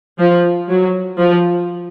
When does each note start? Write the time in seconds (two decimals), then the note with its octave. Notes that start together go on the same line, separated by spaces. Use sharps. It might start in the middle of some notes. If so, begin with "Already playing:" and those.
0.19 F3
0.69 F#3
1.18 F3